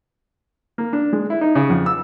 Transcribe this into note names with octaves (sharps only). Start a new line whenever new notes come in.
A#3
D4
G#3
E4
D#4
C#3
F2
E6